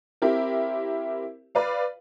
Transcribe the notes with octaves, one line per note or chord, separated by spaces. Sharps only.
C4 E4 G4 A#4
B4 D5 F5